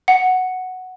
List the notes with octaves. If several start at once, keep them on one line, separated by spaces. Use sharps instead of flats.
F#5